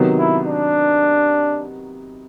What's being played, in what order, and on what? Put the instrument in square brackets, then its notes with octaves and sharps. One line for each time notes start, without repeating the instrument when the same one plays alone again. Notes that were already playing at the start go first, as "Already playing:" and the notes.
Already playing: [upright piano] C3 D#3 F#3 B3 D#4
[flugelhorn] E4
D4